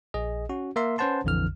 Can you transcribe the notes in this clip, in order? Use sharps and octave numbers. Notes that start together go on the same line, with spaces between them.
A#1 G#4 D#5
C#4 F#4
A#3 A#4 E5 C6
C#4 B4 C5 F#5 A5 C6
A#1 F2 D3 E3 F6